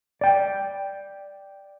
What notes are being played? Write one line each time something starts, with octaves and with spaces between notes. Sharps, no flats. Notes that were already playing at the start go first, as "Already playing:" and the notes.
D5 G5